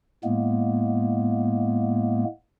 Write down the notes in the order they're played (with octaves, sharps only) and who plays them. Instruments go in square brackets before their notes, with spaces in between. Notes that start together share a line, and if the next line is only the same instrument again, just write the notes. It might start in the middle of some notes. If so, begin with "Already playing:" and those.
[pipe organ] A2 G#3 A#3 B3